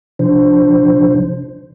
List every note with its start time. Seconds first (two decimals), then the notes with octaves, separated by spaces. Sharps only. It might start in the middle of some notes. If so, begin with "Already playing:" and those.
0.19 C3 F3 D4 C5